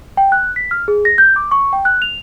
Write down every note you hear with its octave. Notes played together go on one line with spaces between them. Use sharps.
G5
F#6
B6
F6
G#4
A#6
G6
D6
C#6
G5
F#6
F7